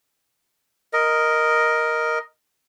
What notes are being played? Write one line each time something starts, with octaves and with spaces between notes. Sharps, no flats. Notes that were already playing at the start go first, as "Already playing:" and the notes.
A#4 D#5